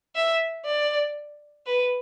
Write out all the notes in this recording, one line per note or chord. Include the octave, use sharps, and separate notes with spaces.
E5
D5
B4